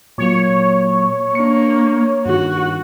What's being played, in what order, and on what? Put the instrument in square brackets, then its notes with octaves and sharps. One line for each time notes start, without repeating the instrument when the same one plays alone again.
[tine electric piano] A#2 F#3 A#3 [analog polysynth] C#5
[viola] A#3 [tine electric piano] D4 C#7
[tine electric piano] G2 D#3 [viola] F#4